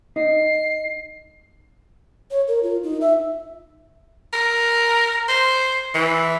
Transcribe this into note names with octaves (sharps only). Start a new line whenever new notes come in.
D#4 C7
C#5
A#4
F4
D#4
E5
A#4
C5
E3